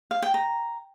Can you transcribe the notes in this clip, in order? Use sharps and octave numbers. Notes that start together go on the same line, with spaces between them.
F5
G5
A#5